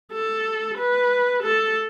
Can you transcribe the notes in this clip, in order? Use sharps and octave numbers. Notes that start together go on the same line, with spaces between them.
A4
B4
A4